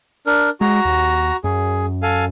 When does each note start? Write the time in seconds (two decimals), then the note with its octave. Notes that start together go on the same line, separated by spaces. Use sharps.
0.27 D4 A#4
0.61 G#3 F#4 A#5
0.85 D#2
1.44 F#2 G#4
2.03 A4 F5 G#5